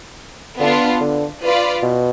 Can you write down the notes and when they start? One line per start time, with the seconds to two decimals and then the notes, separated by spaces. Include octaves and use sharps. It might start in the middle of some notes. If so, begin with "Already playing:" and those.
0.60 D3 B3 D4 F4
1.01 D3
1.42 F4 B4 D5
1.82 B2